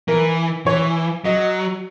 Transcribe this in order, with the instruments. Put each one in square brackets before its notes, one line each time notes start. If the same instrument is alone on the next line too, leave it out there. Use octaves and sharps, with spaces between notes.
[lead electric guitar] E3 [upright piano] A#4
[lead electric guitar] E3 [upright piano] C#5
[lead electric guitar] F#3 [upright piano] D#5